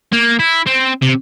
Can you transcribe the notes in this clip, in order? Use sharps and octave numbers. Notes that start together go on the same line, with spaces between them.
A#3
E4
C4
C3